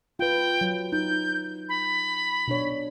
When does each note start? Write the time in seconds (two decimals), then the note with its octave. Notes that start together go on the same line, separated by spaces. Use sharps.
0.19 F4 B4 G5
0.61 F#3
0.92 D#4 G6
1.69 B5
2.48 B2 D4 C#5